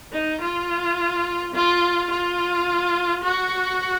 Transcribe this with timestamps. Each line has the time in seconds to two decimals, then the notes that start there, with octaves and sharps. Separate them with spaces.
0.13 D#4
0.41 F4
1.54 F4
2.11 F4
3.24 F#4